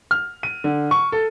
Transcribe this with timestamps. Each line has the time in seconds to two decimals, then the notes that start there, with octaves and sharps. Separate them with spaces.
0.11 F6
0.43 D#7
0.64 D3
0.91 C#6
1.12 A4